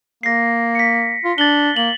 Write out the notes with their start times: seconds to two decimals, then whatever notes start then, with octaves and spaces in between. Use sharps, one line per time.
0.23 A#3 A#6 C7
0.75 B6 C#7
1.24 F4
1.38 D4 A6 F#7 G7
1.76 A#3 F#7